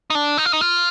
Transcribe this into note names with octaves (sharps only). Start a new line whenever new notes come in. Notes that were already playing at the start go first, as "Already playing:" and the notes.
D#4
D4
D#4
F4
D#4
F4